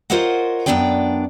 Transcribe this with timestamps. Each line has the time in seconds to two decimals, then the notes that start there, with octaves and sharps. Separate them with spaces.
0.10 F4 A#4 C5 C#5 D#5 F#5
0.66 F#2 D#3 B3 D4 D5 G5